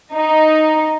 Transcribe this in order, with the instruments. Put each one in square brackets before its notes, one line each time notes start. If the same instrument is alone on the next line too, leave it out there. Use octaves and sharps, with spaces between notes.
[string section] D#4